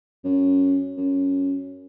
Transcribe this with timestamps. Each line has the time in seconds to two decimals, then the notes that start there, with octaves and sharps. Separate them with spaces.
0.24 F#2
0.97 F#2